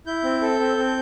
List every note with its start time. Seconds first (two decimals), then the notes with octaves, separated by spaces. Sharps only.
0.07 E4 G6
0.24 C4
0.41 A4
0.60 C4
0.77 C4